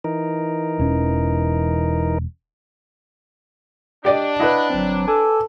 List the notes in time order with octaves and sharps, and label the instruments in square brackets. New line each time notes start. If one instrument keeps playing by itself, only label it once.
[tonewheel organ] E3 D#4 A#4
[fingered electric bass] E1 C#4
[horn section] D4 [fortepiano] G4 D5 D#5
[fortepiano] E4 B4 [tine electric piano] D#5 F#5 B5
[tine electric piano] G1 C4 [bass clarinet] F#3
[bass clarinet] A4 [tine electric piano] G#5 D6